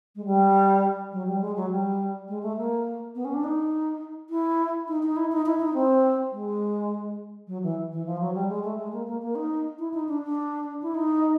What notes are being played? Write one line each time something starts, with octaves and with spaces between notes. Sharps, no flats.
G#3
G3
F#3
G3
G#3
F#3
G3
G#3
A3
A#3
B3
C#4
D4
D#4
E4
D#4
D#4
E4
D#4
E4
D#4
C4
G#3
F#3
E3
E3
F3
F#3
G3
G#3
A3
G#3
A#3
A#3
A#3
D#4
E4
D#4
D4
D4
E4
D#4